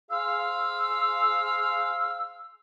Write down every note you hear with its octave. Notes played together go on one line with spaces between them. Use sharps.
G#4 C5 F5 E6